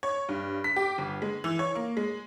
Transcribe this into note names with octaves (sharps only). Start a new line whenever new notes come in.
C#5
G2
B6
G4
G1
G#3
E3
C#5
A#3
G#3